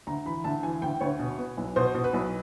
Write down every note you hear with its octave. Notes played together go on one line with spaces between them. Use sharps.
D2 A#5
E3 B5
D2 A5
E3 G#5
D2 G5
D2 C#5
B2
B3
B1
B2 C5
B2
B4
B1